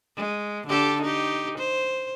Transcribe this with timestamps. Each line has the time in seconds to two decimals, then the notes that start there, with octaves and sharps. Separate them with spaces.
0.17 G#3
0.67 D3 G4 A4
1.02 D#4 G4
1.58 C5